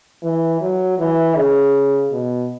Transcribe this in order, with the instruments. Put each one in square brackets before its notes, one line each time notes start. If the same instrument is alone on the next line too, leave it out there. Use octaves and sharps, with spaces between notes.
[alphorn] E3
F#3
E3
C#3
B2